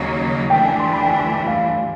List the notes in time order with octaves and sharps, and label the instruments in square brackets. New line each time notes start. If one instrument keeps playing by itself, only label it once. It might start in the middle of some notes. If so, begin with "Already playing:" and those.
Already playing: [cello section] D#2 C#3 F#3 A#3 D#4
[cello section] E3 A3 D4 [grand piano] G5
[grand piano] G#5
C6
B5
G5
G#5
G#5
F5